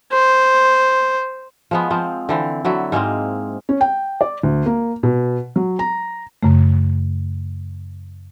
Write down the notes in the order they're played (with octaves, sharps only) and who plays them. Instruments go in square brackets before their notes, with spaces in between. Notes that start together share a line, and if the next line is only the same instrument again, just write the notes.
[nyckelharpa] C5
[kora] F3 G#3 B3
F3 C4
D3 E3 C4
D3 F#3 E4
G#2 G#3 A#3 C4
[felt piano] C#4
G5
D5
D2
A#3
B2
F#3
A#5
[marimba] F#2 C#3 A3